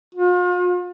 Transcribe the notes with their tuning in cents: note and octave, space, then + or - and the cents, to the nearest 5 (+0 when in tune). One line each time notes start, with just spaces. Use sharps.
F4 +40